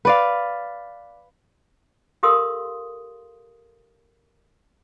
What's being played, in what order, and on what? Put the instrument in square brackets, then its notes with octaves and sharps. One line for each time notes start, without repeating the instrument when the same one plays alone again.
[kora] B4 D5 F5
[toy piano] G4 A4 A#4 F5 C6 D#6